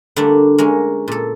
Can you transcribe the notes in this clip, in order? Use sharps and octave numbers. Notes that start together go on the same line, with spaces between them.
D3 G3 A3 A#3 D4
G#3 A#3 C#4
A#2 A4